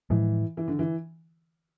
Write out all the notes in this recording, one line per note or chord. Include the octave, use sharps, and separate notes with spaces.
A2 E3 F3 G#3
E3
D3
E3